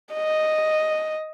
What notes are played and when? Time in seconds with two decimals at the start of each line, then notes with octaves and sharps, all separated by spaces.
0.13 D#5